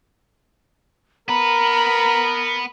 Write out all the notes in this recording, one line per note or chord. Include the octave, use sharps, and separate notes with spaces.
B3 A#4 B4 A#5 B5